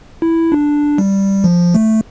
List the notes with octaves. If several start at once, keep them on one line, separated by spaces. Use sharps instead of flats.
E4
D4
G3
F3
A3